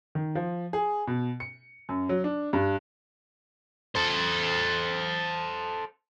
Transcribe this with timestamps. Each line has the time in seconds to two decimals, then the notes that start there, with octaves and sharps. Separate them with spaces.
0.15 D#3
0.35 F3
0.73 G#4
1.07 B2
1.40 C#7
1.89 F#2
2.09 F#3
2.24 D4
2.53 G2
3.95 A4 C5